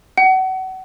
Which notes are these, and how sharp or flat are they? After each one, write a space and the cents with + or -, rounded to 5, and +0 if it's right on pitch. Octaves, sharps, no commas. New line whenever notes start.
F#5 +30